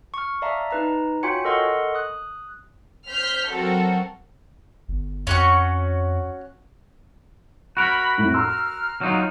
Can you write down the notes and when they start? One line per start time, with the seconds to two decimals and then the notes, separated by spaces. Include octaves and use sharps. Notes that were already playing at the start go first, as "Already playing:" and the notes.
0.14 C#6 F6
0.42 D5 E5 F5 A5 A#5
0.71 D#4 B4 A#5
1.23 F4 F#4 C#5 G5 G#5 C#7
1.45 A4 A#4 D#5 F#5 C6 C#6
1.95 D#6 F#6
3.09 C5 F6 G6 B6
3.50 F#3 C4 F#4 A4 A#4
4.88 G1
5.27 F2 C#4 F#4 C#6
7.77 F#4 A#4 B5
8.18 F2 A2
8.34 A#5 C6 E6 F6
9.01 F#3 D#4 F4